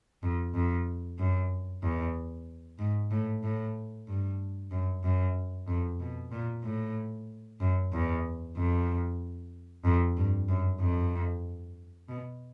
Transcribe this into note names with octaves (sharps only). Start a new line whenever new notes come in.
F2
F2
F#2
E2
G#2
A2
A2
G2
F#2
F#2
F2
B2
A#2
A2
F#2
E2
F2
F2
G2
F#2
F2
B2